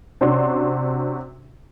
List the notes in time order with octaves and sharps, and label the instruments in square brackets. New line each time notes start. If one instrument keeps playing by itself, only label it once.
[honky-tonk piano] C3 C#4 D4 F#4 C6